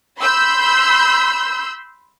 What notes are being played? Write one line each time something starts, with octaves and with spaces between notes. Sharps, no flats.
B5 C6 E6 G6